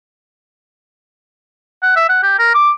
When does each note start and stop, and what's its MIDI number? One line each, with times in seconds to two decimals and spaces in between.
1.83 1.94 78
1.96 2.08 76
2.09 2.22 78
2.23 2.35 67
2.39 2.52 70
2.54 2.71 86